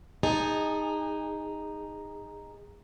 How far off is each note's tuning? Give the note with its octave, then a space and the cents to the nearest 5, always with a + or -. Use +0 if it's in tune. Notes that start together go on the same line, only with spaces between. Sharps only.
D#4 +0 G#4 -25 A5 +0